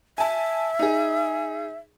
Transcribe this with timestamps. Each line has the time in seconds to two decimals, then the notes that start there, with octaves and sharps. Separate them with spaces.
0.18 E5 G#5 A5
0.79 D#4 G#4